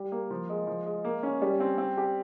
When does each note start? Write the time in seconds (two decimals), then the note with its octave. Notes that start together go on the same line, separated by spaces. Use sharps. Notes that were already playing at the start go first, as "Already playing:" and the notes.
Already playing: G3
0.12 A#3
0.31 F3
0.49 G#3
0.67 F3
0.86 G#3
1.05 A#3
1.23 C#4
1.42 G3
1.60 C4
1.78 C4
1.97 G4